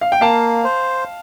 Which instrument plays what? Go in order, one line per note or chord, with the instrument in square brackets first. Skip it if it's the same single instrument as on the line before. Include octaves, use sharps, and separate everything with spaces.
[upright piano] F5
G5
[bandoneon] A#3 [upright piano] F5 A5
[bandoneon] C5